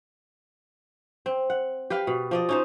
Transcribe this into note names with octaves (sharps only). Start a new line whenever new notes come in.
C4
F#5
G4 B4 F5
B2
F3 D5 D#5
C#4 D#4 C5